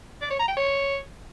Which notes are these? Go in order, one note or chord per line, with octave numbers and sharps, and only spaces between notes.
D5
C#5
A#5
G5
C#5